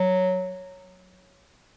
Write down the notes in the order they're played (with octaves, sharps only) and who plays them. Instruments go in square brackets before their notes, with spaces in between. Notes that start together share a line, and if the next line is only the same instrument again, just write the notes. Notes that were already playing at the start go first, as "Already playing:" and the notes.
Already playing: [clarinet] F#3